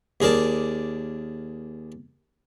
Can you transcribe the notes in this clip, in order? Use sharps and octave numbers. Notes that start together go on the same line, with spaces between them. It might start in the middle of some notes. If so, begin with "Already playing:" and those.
D#2 G#4 A#4 D5 A5